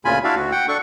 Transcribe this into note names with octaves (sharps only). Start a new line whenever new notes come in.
D2 A#2 C#3 F4 G#5 B5
D4 E4 F#4 D5 E5 F5
D2 F#4
F#5 G5
D4 A4 C#6